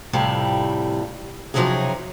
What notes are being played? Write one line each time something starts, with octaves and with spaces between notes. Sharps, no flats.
F2 A2 C3 G3
C3 F3 F#3 C#4 D#4 G#4